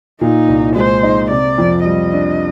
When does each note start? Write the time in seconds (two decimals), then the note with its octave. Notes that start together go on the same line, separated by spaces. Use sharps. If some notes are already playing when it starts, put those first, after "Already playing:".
0.20 A#2 D#4
0.48 C2
0.76 G#3 C5
1.03 D#4
1.31 C3 D5
1.58 F2
1.85 G3 D#5
2.13 D4